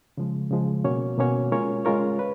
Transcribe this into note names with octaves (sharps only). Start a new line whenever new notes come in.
C#3 F3 G#3
C#3 F3 G#3
B2 A#3 C#4 F#4 C#5
B2 A#3 C#4 F#4 C#5
G#3 C#4 F4 A#4 C#5
G#3 C#4 F4 A#4 C#5
B4